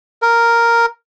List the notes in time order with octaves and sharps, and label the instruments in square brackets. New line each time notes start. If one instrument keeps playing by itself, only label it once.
[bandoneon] A#4